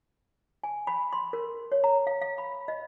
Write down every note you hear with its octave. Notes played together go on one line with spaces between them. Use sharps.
G#5
B5
C6
A#4
C#5
A#5
F5
F5
B5
D#5